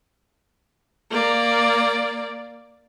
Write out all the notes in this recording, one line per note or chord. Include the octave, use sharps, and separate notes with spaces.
A#3 D5